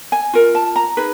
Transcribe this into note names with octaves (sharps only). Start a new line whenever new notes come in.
G#5
F4 A#4
A5
A#5
D#4 G#4 B4